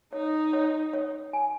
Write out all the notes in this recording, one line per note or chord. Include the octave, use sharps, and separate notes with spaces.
D#4 C#5
C#5
C#5
G#5